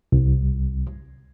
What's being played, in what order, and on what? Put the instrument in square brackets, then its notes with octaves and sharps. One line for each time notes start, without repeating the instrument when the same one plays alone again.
[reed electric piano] C2